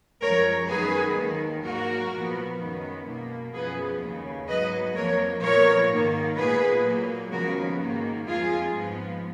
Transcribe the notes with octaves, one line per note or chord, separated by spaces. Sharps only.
F#2 F3 G#3 A#4 C#5
F#2 D#3 G#3 B3 G#4 B4
D#2 D#3 G#3
G#2 F#3 A#3 F#4 A#4
A#2 F3 B3
F#2 D#3 G#3 B3
B2 A#3
F#2 F3 B3 G#4 B4
D#2 C#3 G#3
G#2 F#3 B3 B4 D#5
F2 F3 A#3 A#4 C#5
A#2 F3 B3 A#4 C#5
G#2 D#3 A#3
A#2 G#3 B3 G#4 B4
A#2 F#3 A#3
D#2 C#3 F3 G#3 B3 F#4 A#4
G#2 D#3 A#3
F2 F3 G#3 F4 G#4
G#2 F3 G#3 B3